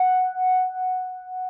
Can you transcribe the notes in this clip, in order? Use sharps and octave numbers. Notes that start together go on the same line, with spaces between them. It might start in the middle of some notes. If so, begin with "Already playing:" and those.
Already playing: F#5